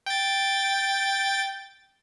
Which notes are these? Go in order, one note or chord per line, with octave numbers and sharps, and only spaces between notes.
G5 A6